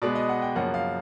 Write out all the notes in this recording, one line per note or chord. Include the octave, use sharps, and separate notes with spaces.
B2 G#3 B3 D5
D#5
F#5
G5
F#2 C#3 F3 A#3 F#5
F5